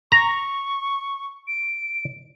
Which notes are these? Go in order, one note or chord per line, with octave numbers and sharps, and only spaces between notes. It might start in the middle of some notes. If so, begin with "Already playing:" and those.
A#5 C#6
D7